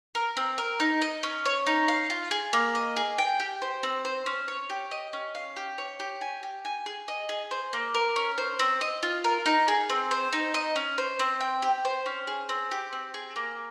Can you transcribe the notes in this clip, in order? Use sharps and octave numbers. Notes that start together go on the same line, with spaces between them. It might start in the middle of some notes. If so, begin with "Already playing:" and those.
A#4
C4
A#4
D#4
D#5
C#4
C#5
D#4
F5
F4
G#4
A#3
D#5
G#4
G5
G4
C5
C4
C5
C#4
C#5
G4
D#5
C#4
F5
G4
C#5
G4
G#5
G4
G#5
G#4
D#5
G#4
C5
A#3
A#4
C#4
C5
C4
D#5
F4
A#4
D#4
G#4
C4
C5
D#4
D#5
C#4
C5
C4
G5
G4
C5
C#4
G#4
C4
G4
C4
G#4
A#3